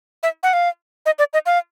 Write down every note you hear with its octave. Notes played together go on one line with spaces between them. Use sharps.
E5
F#5
F5
D#5
D5
D#5
F5